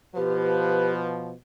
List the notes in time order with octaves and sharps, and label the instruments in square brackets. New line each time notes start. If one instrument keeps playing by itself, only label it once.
[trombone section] B2 F3 [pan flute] G4 [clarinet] B4